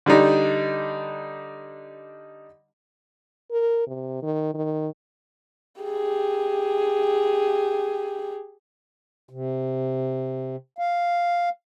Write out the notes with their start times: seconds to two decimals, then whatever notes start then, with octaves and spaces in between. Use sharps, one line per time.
0.06 D3 G3 D4 D#4 G4
3.51 A#4
3.87 C3
4.22 D#3
4.54 D#3
5.82 G4 G#4
9.29 C3
10.79 F5